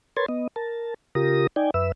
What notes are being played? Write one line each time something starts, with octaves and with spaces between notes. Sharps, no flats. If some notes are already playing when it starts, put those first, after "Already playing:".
A#4 B4 C#5 C6 G#6 A6
B3 D#5
A#4 A5
C#3 F4 G4 A#4 D#6 A#6
D#4 D5 G5 G#5
F#2 B4 E5 E6